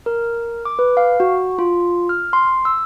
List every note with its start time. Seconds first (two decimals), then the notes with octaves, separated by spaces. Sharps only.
0.06 A#4
0.65 D6
0.79 B4
0.97 F5
1.20 F#4
1.59 F4
2.09 F6
2.33 C6
2.65 E6